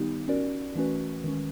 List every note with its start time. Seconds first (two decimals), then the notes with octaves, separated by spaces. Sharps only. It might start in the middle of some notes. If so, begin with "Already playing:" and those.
Already playing: D#3 G3 B3 D#4 G4
0.28 C#4 F#4 A#4 D5
0.75 E3 A3 C#4 F#4 B4
1.24 D#3 G#3 C#4